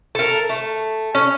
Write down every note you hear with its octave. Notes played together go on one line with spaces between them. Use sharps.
A4 A#4
A3
C#4